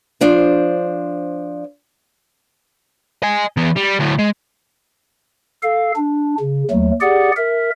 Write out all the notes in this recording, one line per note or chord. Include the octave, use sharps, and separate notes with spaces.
F3 D4 C5
D#5 G#5
E3 B3
G3
D2 A2
G#3
A4 F5
D4
C#3
D#2 F#3 A3
G4 G#4 D5 F#5
A#4 E5